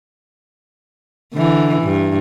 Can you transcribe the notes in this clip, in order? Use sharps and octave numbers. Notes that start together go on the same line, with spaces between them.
D3 E3
G2